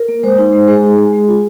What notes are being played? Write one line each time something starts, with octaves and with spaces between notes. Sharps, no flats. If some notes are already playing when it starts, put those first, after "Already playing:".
Already playing: A#4
A#3
G#3 C5
D#4
G#3
G#3 G#4
D#4
G#3
G#3
F4